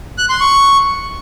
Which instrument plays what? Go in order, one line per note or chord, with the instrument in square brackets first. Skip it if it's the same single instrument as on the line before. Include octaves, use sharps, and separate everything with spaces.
[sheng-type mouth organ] F#6
C6
C#6